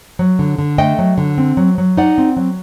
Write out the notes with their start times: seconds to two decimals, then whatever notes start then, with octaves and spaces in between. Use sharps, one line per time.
0.19 F#3
0.39 D3
0.58 D3
0.78 A3 D#5 G5
0.99 F#3
1.18 D3
1.38 C4
1.57 F#3
1.78 F#3
1.97 D#4 D5 F#5
2.18 C4
2.37 F#3